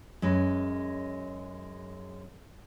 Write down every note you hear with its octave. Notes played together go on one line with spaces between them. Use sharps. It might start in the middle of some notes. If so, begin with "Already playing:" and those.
F#2 G#3 B4